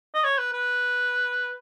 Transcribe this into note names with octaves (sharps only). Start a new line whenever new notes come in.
D#5
C#5
B4
B4